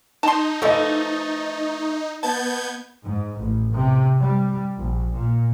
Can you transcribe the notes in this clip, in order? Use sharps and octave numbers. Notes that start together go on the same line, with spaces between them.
D#4 A5 C6
E3 F3 A3 A4 D#5
B3 A5 G6 G#6
G#2
A1
C3
G3
A#1
A#2